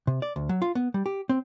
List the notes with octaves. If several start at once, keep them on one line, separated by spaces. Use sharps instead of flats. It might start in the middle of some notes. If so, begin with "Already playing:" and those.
C3
D5
D2
F#3
F4
B3
G3
G4
C4